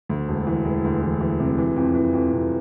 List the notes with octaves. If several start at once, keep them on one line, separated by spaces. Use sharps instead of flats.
D2
E1
E3
E1
D2
E3
E3
C3
E3
F2
E3
F2
C3